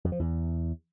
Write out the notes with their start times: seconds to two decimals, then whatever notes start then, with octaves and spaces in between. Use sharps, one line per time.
0.04 F2
0.12 F3
0.19 E2